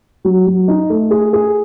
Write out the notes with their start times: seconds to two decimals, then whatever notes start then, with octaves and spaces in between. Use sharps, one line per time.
0.25 F#3
0.47 F#3
0.68 D#4
0.90 A3
1.11 G#4
1.33 G#4